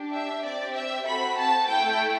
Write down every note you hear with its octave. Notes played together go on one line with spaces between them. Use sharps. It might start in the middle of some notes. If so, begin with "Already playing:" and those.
Already playing: D4 G4
E5
C4 G4 D5
E5
C4 F#4 A4 B5
A5
A3 E4 A4 G5